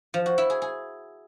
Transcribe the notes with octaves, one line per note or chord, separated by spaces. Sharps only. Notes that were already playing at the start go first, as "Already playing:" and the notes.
F3
F#4
E4
G#4
G#4